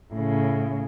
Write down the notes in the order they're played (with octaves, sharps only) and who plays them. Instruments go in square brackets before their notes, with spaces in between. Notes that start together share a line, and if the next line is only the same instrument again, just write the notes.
[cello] A2 C#3